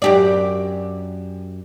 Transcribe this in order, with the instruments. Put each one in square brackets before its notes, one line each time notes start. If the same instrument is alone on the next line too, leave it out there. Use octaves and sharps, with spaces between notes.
[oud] F#2 G4 D5